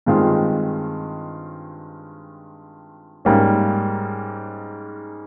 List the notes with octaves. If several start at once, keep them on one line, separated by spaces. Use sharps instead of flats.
G2 D#3 G#3 C4 F4
G#2 G3 A#3 C#4